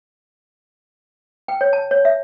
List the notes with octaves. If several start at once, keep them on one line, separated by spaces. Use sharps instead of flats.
G5
C#5
A5
C#5
E5